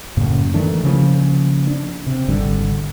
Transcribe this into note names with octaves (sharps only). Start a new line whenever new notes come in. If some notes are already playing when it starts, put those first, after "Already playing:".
F#2 A2 C#3 A#3
D#3 E3 A3 D4
C#3 F3 A#3
D4
C3
G#1 D3 G3